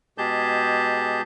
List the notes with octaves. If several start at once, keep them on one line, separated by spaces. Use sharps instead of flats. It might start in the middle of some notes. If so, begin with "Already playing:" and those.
B2 G#3 G4 G#4 A5 G6